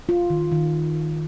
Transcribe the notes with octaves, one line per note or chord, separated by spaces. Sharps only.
F4
D#3
D#3